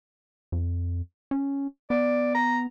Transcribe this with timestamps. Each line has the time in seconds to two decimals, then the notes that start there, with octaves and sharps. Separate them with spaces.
0.52 F2
1.31 C#4
1.90 B3 D5
2.35 A#5